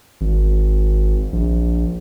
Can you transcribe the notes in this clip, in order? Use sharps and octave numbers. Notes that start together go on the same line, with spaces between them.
G#1
A#1